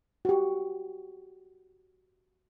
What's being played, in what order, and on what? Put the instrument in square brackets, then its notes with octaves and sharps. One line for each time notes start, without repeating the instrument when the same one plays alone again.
[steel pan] F#4 G4